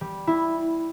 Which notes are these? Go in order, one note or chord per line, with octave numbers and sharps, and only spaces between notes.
G3
E4